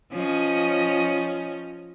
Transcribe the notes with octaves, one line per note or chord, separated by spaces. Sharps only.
F3 C#4 D#5